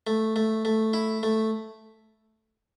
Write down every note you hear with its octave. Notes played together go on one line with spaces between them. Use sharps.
A3
A3
A3
E4
A3